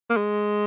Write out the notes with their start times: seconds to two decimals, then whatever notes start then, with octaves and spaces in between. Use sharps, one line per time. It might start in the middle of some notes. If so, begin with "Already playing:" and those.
0.10 A#3
0.17 G#3